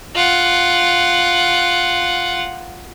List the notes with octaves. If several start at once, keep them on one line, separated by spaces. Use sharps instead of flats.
F4 F#5